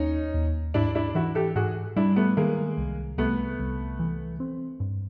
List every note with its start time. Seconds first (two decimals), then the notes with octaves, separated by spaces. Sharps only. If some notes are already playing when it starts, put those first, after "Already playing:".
Already playing: D#2 C#4 D#4
0.34 D#2
0.74 G#2 D4 E4
0.95 D4 E4
1.15 E3 E4 F#4
1.35 G4 A4
1.55 G#2 F#4 G#4
1.96 G3 D4 E4
2.16 A3 B3
2.37 D#3 G#3 A#3
2.78 C2
3.18 C2 A3 B3
3.59 C2
3.99 E3
4.40 C4
4.80 G2